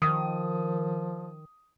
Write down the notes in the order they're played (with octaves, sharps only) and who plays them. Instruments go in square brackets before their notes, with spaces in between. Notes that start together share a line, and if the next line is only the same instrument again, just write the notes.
[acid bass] D#3 [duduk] F3 [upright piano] D#6